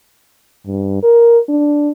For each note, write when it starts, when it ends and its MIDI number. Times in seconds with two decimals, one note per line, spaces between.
0.66 1.03 43
1.03 1.39 70
1.49 1.91 62